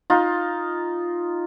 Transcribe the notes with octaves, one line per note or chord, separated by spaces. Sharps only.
D#4 F4